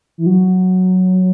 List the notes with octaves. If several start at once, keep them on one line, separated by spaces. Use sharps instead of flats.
E3
F#3